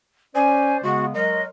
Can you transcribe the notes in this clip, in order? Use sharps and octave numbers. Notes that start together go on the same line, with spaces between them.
C#4 C5 D5 G#5
C#3 G#3 B3 F#4
F#3 G#3 A#4 D#5